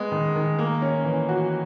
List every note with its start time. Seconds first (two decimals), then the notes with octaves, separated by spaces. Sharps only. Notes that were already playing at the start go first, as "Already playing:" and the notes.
Already playing: G#3 B3
0.11 D#3
0.35 D#3
0.59 A#3
0.82 C#4
1.05 E3
1.29 F#4